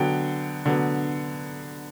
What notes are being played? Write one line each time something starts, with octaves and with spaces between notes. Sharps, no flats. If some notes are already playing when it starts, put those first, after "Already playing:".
Already playing: D3 F#3 B3 G5
D3 F#3 B3